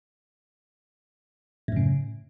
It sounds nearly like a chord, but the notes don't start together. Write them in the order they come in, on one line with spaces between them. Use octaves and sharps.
A2 F#2 C#3